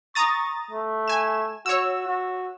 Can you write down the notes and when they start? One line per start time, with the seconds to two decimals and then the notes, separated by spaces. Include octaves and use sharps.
0.15 A#5 C#6 D#6 A6
0.71 A3
1.08 G#5 E7
1.66 F#4 C#5 E6
2.07 F#4